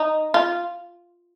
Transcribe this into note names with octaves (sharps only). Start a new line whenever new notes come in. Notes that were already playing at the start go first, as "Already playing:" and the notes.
Already playing: D#4
F4